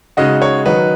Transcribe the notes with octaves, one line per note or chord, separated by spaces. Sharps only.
C#3 G#3 D#4 F#4 D#5
C#5
D#3 F#3 D#4 F#4 B4